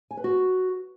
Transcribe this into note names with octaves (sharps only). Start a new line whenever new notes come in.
G#5
B4
F#4